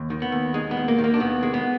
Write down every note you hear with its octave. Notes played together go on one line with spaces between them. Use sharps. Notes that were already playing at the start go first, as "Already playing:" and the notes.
Already playing: D#2
D#3
B3
D#2
G#3 D#4
B3
D#2
A#3
D#3
A#3
D4
D#2 B3
G#3
B3